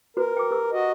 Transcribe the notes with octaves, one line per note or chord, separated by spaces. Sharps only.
F#4 A#4 B4
G5 D6
G4 B4 E6
F#4 D#5